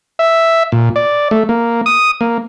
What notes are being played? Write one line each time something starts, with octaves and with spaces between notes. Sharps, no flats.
E5
A#2
D5
A3
A#3
D#6
A#3